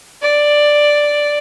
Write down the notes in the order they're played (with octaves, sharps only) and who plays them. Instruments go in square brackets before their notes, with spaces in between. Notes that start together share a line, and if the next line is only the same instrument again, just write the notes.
[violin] D5